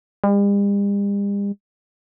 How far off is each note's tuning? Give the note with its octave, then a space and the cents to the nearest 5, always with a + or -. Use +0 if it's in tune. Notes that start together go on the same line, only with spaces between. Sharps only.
G3 +45